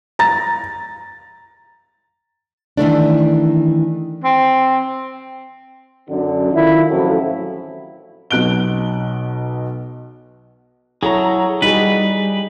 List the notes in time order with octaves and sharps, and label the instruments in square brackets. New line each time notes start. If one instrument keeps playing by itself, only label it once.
[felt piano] A#5 A6
[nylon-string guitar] D#3 E3 A3 D4
[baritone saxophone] C4
[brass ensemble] F#2 D3
D#3 E4 F4
A1 F2 A2 C#3 F3 F#3
[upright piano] B1 B2 F#6 D7 G7
[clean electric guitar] F#3 [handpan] E4 A4 C#5 [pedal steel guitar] G#4 A#5
[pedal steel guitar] G3 [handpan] D#4 F#4 G#4 [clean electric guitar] B4